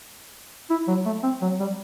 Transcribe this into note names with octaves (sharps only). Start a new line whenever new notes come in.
E4
F#3
A3
C4
F#3
G3